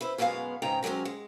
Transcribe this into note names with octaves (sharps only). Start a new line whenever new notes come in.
E4 B4 C5
F#2 B2 G#3 B3 F5
G#2 C#3 D#4 G5 A#5
C3 F#3 G#3 C4 C#4
G#3